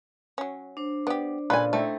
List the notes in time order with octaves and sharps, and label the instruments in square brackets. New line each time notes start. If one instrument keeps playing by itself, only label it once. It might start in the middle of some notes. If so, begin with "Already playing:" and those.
[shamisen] F#3 C#4
[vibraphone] D4 C5
[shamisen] B3 G4 [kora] D5
[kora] A#2 C#3 A4 [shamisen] F4 [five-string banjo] B4 G#5
[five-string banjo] A3 [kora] C4 D#4 E4